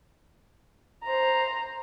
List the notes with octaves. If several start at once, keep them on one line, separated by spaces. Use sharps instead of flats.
C5 A#5